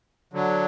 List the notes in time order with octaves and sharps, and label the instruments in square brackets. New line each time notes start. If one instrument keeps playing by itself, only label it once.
[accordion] D3 F#3